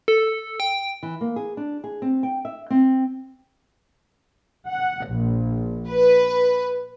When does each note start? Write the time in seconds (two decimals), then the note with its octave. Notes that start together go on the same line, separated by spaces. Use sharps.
0.08 A4
0.60 G5
1.03 E3
1.21 A#3
1.36 G#4
1.57 D4
1.84 G#4
2.02 C4
2.23 G5
2.45 E5
2.70 C4
4.68 F#5
5.08 A#1
5.91 B4